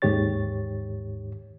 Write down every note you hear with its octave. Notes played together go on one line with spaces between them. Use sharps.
D#2 G#2 D#3 G4 C#5 A6